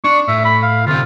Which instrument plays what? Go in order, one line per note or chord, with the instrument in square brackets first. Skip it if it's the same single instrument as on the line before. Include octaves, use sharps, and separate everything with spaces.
[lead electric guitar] D4 [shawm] C#6
[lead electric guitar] A2 [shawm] E5
[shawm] B5
F5
[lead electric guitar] D2 C3 [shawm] F4